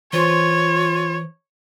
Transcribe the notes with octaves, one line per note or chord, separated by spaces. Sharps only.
E3 F4 C5 C#5 C6